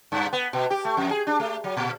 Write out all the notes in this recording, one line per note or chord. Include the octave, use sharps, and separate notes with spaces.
G2
B3
B2
G4
A3
F2
G#4
D4
A3
F#3
A#2